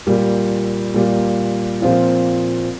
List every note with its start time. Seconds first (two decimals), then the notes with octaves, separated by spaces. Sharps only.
0.07 A#2 G3 A#3
0.94 A#2 G3 A#3
1.81 A#2 F3 C4 F4